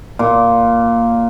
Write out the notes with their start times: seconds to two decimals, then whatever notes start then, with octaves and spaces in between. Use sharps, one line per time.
0.19 A#2